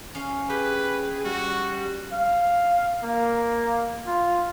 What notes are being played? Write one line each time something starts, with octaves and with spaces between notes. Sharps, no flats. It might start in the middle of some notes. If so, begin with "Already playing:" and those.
C#4 F5
G4 G#4 B4
G3 F#4
F5
A#3
F4